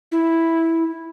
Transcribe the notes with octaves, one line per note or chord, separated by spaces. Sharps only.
E4